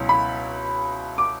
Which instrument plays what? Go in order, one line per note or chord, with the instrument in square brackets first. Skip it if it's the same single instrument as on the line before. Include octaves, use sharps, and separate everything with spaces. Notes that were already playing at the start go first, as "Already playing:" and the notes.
Already playing: [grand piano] C#2 B2 F#3 C#4 E4
[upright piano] B5
D6